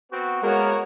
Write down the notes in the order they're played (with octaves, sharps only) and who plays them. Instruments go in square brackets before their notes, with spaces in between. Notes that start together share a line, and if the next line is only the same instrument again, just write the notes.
[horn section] B3 C4 F#4
[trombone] G#3 [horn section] A#3 B3 [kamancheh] F#4 C#5 [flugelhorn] A#4